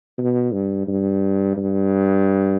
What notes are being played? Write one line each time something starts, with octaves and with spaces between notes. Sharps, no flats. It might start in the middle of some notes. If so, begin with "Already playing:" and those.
B2
G2
G2
G2